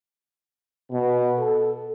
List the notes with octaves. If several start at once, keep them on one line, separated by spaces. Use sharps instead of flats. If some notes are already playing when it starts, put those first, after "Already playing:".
B2
A4